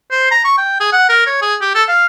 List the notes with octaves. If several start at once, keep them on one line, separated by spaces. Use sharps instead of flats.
C5
A#5
C#6
G5
G#4
F#5
A#4
C#5
G#4
G4
A4
F5